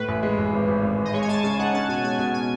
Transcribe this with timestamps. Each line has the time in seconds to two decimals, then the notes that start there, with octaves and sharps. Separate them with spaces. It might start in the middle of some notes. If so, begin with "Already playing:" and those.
Already playing: A2 B4
0.08 A1
0.23 G#3
0.38 A1
0.53 G#1
0.68 G#1
0.83 G#1
0.98 G#1
1.05 D#5
1.13 G#3 C#5
1.22 G#5
1.28 G#3 A5
1.44 C#3 G#5
1.59 D#4 F#5
1.74 C#4 A5
1.88 B2 G#5
2.04 G#3 G#5
2.18 B2 G#5
2.34 G#5